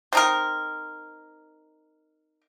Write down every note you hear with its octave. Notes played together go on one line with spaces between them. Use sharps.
C4 D#4 A#4